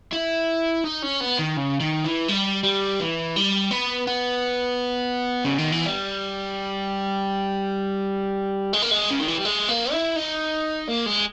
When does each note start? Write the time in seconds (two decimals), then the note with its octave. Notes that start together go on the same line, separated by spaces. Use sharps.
0.13 E4
0.85 D#4
1.03 C#4
1.21 B3
1.39 D#3
1.57 C#3
1.80 D#3
2.04 E3
2.28 G3
2.64 G3
3.00 E3
3.36 G3
3.71 B3
4.07 B3
5.45 C#3
5.58 D#3
5.72 E3
5.86 G3
8.73 G#3
8.82 A#3
8.91 G#3
9.11 C#3
9.19 D#3
9.28 E3
9.36 G3
9.45 G#3
9.69 A#3
9.92 E4
10.16 D#4
10.88 A#3
11.06 G#3